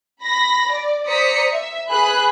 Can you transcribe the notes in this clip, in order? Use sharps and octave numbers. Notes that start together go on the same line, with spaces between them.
B5 A#6
D5
C5 D5 A#5 D#6 B6 C#7
E5
G#4 B4 B5 F#6